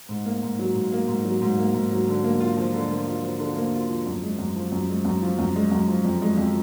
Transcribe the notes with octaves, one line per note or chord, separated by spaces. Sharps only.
G#2
A#3
G#2
F#3
G#2
A#3
G#2
F#3
G#2
A#3
G#2
F#3
D3
A#3
F4
F3
D3
A#3
F4
F3
D3
A#3
F4
F3
F#2
G#3
F#2
F3
F#2
G#3
F#2
F3
F#2
G#3
F#2
F3
F2
G#3
F2